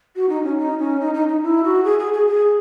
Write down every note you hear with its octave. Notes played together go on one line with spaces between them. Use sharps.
F#4
D#4
C#4
D#4
C#4
D#4
D#4
D#4
E4
F#4
G#4
G#4
G#4
G#4